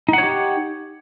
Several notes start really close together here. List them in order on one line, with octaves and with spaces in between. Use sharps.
D#4 F#5 C#5 G4